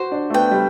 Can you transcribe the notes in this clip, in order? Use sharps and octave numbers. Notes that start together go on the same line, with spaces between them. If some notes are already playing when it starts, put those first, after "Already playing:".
Already playing: F#4 C5
D4
A3
B3 G5
G3